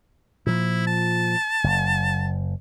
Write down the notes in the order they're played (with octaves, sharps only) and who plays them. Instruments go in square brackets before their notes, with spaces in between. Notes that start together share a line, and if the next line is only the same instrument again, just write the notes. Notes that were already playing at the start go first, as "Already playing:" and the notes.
[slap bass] A#2 F3 [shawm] E4
[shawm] A5
[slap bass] F#1